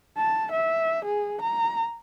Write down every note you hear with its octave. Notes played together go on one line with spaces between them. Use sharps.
A5
E5
G#4
A#5